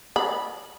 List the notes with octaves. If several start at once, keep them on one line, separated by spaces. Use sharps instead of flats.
B5